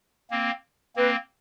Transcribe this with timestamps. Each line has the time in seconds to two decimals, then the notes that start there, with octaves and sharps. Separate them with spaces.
0.31 A#3 C4
0.96 A#3 C4 B4